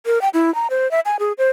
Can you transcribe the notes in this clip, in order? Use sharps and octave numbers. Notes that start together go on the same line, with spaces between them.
A#4
G5
E4
A#5
C5
E5
G#5
G#4
C5